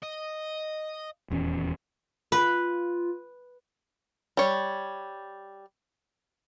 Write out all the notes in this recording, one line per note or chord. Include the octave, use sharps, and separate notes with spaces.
D#5
D#1 E2 C#4
F4 B4
G3 C#5